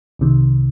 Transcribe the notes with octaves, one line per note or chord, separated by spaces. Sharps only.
C2 C3 D#3